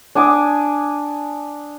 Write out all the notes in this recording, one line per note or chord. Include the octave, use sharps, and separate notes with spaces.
D4 G#5 D6 D#6